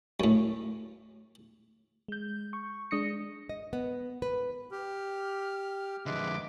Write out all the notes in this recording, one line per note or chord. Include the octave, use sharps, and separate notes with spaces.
F#2 A2
G#3 G6
C#6
G#3 D4 D#6 A#6 C#7
D#5
B3
B4
G4 F6
F2 D3 G#3 B4 E5 D6